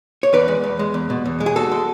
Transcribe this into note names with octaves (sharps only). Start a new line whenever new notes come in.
C#5
E2 B4 D5
G#3
E2
G#3
E2
B2
E2
G#3
G#4
E2 F#4 A4
G#3